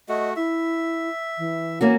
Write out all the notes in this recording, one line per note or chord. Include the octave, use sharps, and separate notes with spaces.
A3 F#4 D#5
E4 E5
E3
A#3 C#4 F#4